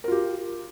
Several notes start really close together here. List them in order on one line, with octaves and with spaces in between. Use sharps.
A#4 F4 G4